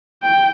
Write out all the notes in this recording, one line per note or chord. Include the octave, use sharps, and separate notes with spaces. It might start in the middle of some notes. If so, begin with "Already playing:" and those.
G5